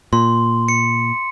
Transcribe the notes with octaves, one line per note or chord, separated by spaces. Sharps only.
A#2 C6
C#7